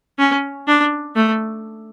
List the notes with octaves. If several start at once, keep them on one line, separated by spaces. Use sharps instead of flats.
C#4
D4
A3